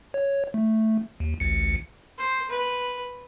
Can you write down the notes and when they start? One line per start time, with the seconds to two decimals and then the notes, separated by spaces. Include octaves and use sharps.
0.14 C#5
0.54 A3
1.20 D#2
1.40 A1 D2 C#7
2.18 C5
2.50 B4